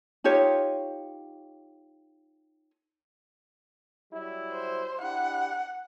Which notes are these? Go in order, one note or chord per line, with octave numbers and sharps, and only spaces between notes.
D#4 F4 G4 C#5
F#3 G3 E4
C5
D4 E4 G4 F#5